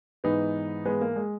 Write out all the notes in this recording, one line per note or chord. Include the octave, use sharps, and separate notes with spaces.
G#2 E3 B3 D#4
G#3 B3
A#3
G#3